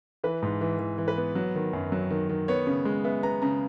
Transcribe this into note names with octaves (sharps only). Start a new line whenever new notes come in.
E3 B4
G#2
E3
E3
E3
B4
B3
F#3
D#3
F#2
F#3
D#3
D#3
B3 C#5
C#3
G#3
B3 E5
B3 A#5
C#3 A#5